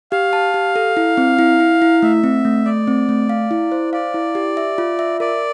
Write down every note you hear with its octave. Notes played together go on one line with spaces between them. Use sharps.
G4 F5
A5
G4
A4
E4
C4
E4
E4
E4
A3 E5
C4
A3
A3 D5
C4
A3
F5
E4
C5
D5 F5
E4
G4
E5
F4
E5
A#4 D5